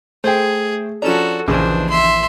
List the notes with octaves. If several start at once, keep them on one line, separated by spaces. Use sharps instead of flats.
A3 G#4 C5 G5
F3 C#4 D4 F#4 A4 A#5 E7
A#1 D#2 C#3 E3 D4 G#4 C5
E5 C6